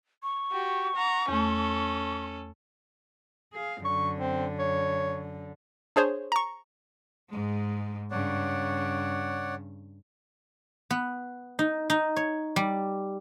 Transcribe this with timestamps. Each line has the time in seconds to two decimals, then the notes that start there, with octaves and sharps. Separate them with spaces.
0.23 C#6
0.52 F#4 G4
0.96 F#5 A#5
1.28 E2 A3 C#4 A4
3.53 G#4 F5
3.85 F#2 D3 C#6
4.18 C4
4.59 C#5
5.96 D4 G#4 C5 C#5
6.32 A#5 C#6
7.29 G#2 G#3
8.11 G2 C#3 C#5 D5 F#5
10.90 B3
11.59 D#4
11.90 D#4
12.16 C#5
12.56 G3